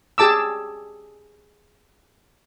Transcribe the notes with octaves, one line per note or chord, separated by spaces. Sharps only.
G4 G#4 A5 D6 E6